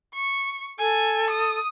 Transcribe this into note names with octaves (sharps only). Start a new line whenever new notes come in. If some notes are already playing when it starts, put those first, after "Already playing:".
C#6
A4 G#5
D#6